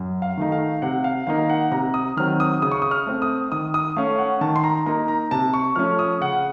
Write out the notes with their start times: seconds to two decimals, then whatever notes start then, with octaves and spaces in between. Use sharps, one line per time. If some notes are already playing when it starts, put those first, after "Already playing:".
Already playing: F#2
0.22 F5
0.37 D#3 A3 D#4
0.52 F5
0.82 C3 F#5
1.04 F5
1.27 D#3 A#3 D#4 F5
1.49 F#5
1.71 C3 A#5
1.94 D#6
2.17 D#3 F#3 C4 F6
2.40 D#6
2.62 C#3 D#6
2.72 C#6
2.82 D#6
2.91 F6
3.06 A3 C4
3.22 D#6
3.52 D#3 D#6
3.74 D#6
3.96 A3 C#4 F5
4.18 F#5
4.41 D#3 A5
4.56 C6
4.64 A#5
4.86 A#3 D#4 A#5
5.08 A#5
5.31 C3 A5
5.54 C#6
5.76 F3 A3 C#4 F6
5.99 D#6
6.20 C#3 F#5